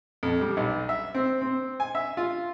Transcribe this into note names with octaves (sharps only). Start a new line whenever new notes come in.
F2
G3
B1
E5
C4
C4
G#5
E5
F4